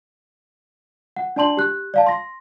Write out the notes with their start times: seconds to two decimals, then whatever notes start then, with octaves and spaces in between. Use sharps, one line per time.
1.16 F#5
1.36 D4 D5 A5 C6 F#7
1.57 G4 F#6
1.94 D5 F5 A5
2.06 C6 A#6